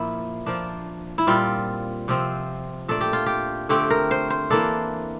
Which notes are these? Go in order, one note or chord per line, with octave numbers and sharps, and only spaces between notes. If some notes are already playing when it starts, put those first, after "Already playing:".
Already playing: A#2 F3 A#3 E4
F3 A#3 D4
E4
A#2 G3 C4 F4
C3 F3 C4
A#2 A3 D4 A4
G4
F4
G4
D3 A3 C4 G4
A#4
C5
C5
E3 A#3 D4 A4